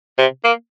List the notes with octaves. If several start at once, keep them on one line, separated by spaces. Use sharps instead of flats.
C3
A#3